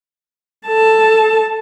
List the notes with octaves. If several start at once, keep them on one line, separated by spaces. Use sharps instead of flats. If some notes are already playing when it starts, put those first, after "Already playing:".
A4 A5